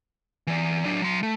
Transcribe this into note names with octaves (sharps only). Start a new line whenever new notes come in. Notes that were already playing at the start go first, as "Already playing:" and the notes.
E3 D5
F#3 D4
F#3 C6
A3